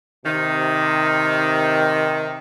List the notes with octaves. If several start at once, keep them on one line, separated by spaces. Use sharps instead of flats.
C3 D#3